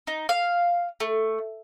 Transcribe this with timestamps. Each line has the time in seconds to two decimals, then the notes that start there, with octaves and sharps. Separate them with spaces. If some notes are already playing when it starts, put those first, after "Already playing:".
0.07 D#4
0.29 F5
1.00 A3